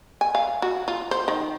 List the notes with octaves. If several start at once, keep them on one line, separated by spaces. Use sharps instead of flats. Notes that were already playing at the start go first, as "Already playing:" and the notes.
G#5
F5
F#4
F4
C5
D#3